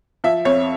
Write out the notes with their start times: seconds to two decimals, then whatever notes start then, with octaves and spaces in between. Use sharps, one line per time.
0.24 F3 E5
0.45 F2 C#5